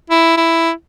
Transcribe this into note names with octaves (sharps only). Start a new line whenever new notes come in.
E4
E4